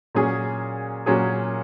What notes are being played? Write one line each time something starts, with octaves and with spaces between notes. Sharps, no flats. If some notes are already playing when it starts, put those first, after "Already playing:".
A#2 F#3 C#4 G#4
A#2 F#3 C#4 G#4